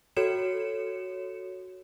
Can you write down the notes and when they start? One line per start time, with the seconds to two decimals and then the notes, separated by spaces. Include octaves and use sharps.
0.17 F#4 A4 C#5 C#7 E7